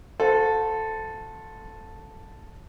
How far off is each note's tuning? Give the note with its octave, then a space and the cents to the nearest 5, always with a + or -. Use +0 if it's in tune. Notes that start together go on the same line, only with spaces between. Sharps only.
F#4 -45 A4 +0 C5 -20